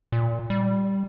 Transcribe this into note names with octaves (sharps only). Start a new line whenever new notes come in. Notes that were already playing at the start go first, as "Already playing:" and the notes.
A#2
G3